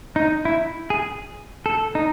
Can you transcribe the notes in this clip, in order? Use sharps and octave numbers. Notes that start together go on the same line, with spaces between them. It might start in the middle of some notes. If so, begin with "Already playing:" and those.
D#4
E4
G#4
A4
D#4